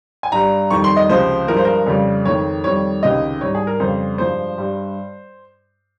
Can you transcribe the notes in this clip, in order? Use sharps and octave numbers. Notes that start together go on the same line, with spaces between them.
G#5
G2 G3 A#5
F2 D#3 G3 C#6
C6
D#5
C#2 C3 F3 G#3 C5
G2 F3 G#3 A#4
C5
A#4
F2 C#3 G3
F2 D#3 G#3 C#5
F2 D#3 G3 C#5
C#2 C3 D#3 G#3 D#5
G#2 G3 C#5
G#4
A#4
F2 C#3 G3 C5
G2 F3 G#3 C5
G2 G3